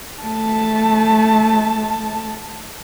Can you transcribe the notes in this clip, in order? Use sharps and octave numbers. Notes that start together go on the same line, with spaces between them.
A3 A5